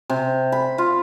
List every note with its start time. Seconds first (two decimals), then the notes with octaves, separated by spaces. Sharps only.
0.10 C3
0.52 B5
0.78 F4